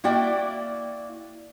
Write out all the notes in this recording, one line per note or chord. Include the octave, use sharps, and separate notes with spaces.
A#3 E4 F#4 D5 G5